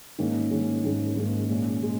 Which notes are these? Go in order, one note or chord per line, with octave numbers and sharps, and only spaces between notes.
G#2 D#3 A#3 C#4 G#4
G#2 D#3 A#3 C#4 G#4
G#2 D#3 A#3 C#4 G#4
G#2 D#3 A#3 C#4 G#4
A#2 G#3 C#4
A#2 G#3 C#4